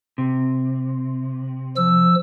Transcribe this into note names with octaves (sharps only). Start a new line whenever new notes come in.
C3
F3 E6